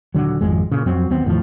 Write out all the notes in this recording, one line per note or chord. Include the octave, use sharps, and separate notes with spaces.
D#1 D3 F#3
G#1 F2 G#3
A#2 C#3
F2 F#3 C4
D#2 B3 C4
E2 A2 D#3 F3